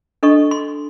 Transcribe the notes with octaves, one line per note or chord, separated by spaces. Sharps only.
D4 A4 D#5 C#6
C6